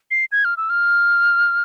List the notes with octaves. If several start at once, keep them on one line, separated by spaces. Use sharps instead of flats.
C7
G#6
F6
E6
F6